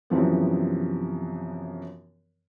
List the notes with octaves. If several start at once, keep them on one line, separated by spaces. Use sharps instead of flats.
F#2 C3 E3 F3 B3